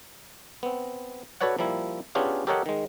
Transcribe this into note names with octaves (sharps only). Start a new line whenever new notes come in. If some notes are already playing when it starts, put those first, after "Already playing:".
B3 C4
F#4 A4 B4 C#5 D5 F#5
F3 G3 A#3 E4
B3 C#4 D4 F4 G4 G#4
G4 A4 A#4 C#5 D#5 F#5
D#3 G#3